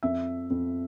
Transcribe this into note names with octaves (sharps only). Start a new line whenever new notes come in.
F2 E5
F2